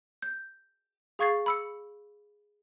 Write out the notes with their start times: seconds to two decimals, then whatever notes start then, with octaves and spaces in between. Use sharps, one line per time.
0.22 G6
1.19 G#4 F5 C#6 G#6 A6 C7
1.46 B5 E6 C#7